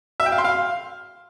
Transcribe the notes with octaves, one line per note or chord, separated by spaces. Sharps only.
E5
G5
F5
C6
F5